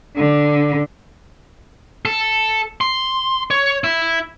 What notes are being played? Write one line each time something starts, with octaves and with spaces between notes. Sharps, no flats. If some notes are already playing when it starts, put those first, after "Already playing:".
D3
A4
C6
C#5
E4